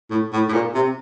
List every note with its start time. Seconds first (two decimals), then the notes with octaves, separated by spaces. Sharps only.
0.11 A2
0.33 A2
0.49 A2
0.53 A#2
0.75 C3